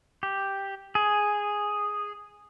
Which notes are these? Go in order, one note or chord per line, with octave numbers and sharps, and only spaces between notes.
G4
G#4